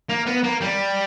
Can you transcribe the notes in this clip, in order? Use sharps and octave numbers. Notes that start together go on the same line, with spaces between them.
A#3
B3
A#3
G3